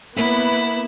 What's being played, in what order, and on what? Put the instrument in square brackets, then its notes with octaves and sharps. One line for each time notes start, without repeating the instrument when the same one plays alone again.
[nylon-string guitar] A#3 E5 [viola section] B3 B5 [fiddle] E4